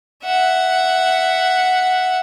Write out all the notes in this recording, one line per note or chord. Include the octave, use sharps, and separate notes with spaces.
E5 F#5